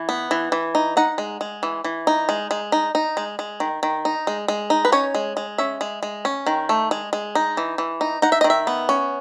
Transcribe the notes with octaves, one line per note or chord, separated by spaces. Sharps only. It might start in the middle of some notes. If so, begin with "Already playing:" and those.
Already playing: E3
B3
E3
E3
D#4
D#4 F#5
G#3
G#3
E3
E3
D#4
G#3
G#3
D#4
D#4
G#3
G#3
D#3
D#3
D#4
G#3
G#3
D#4
B4
C#4 C#5
G#3
G#3
C#4 E5
G#3
G#3
C#4
D#3
A3
G#3
G#3
D#4
E3
E3
D#4
D#4 F#5
E5
D#3 D#5
E5
B3
C#4